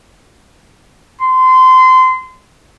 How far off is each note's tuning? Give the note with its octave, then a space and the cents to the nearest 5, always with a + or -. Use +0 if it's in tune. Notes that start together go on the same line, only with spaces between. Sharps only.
C6 -25